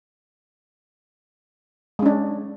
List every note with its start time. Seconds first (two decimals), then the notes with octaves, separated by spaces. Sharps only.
1.99 G#3
2.02 C#4
2.06 D4